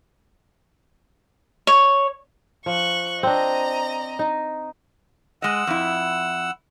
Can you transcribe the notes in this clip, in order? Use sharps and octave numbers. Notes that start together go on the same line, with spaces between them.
C#5
F3 C#6 F#6
C4 D4 D#5 A#5
D#4
G#3 D#5 F#5 E6
F2 E4